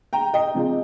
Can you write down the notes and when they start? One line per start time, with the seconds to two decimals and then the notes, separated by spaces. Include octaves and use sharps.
0.13 G5 A#5
0.34 D#5 G5
0.55 C3 F3 G#3